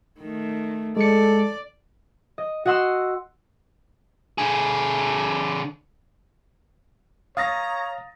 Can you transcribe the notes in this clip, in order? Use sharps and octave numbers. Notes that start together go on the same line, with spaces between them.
D#3 A3
G#3 A4 D5 C#7
D#5
F#4 D#5 F#5 C6 E6
D3 G#4
C#5 F5 A#5 D#6 A6 A#6